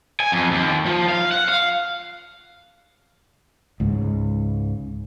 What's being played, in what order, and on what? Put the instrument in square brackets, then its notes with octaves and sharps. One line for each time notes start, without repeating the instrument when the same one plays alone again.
[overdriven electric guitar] G#5
F2
D#2
F3
F5
F#5
F5
[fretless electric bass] C#2 G#2 C#3